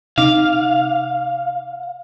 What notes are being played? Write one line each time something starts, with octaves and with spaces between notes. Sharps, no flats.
C3 D#4 F5 D6